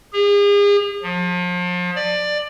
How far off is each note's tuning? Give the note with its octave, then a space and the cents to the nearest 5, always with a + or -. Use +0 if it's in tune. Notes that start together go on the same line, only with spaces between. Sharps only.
G#4 -40
F3 +35
D5 +15